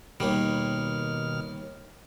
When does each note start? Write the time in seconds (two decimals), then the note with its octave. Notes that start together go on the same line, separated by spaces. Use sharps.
0.20 D#2 B2 D#3 G3 F6